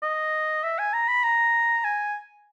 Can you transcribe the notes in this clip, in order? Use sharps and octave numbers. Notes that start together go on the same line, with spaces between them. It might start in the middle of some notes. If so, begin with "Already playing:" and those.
D#5
E5
G#5
A#5
B5
A#5
G#5